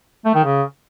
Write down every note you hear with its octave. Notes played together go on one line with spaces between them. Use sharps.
A3
D#3
C#3